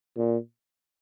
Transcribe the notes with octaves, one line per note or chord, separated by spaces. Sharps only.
A#2